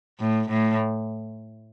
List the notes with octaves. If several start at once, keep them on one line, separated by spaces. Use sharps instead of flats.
A2
A2